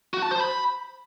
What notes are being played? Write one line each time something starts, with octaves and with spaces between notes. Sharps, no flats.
F#4
A5
C5
B5